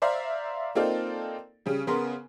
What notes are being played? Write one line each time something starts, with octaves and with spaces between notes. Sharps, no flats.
C5 D5 E5 F5 A#5
A#3 C4 D#4 F4 A4 D5
C#3 G3
C#3 B3 A#4 C6